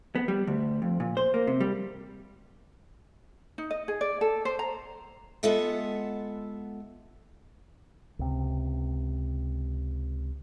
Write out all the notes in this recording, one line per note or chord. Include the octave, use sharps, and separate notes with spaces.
B3
G3
D2
F2
A#2
C5
A#3
C3
G3
D#4
D#5
G#4
D5
A4
C5
A#5
G#3 B3 F4 A4 E5 F#5
C#2 C3